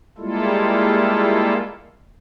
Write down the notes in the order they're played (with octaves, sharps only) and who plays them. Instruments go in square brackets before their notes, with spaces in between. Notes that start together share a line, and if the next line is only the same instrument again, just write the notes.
[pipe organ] G3 G#3 A#3 E4 F4 A4